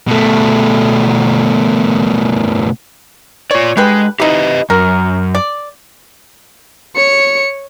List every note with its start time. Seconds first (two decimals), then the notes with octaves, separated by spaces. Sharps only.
0.08 B2 A3
3.51 F4 C#5 D5
3.77 D3 G3 G#3 B4
4.20 D#4 E4 G4 B4 D#5
4.70 F#2 A#4
5.35 D5
6.95 C#5 C#7